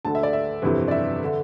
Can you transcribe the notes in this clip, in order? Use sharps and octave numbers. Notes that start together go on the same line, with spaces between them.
D2 D3 A5
E5
D5
E5
G1 F2 C3 E3
D5
E5
D3